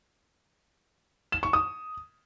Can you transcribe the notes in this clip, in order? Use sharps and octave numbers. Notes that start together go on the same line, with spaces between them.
E7
C#6
D#6